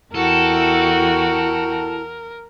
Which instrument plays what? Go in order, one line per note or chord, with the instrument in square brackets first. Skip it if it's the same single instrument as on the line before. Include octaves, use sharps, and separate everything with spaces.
[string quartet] E2 F#4 G5 [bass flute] E4 [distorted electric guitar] A4 [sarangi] A#4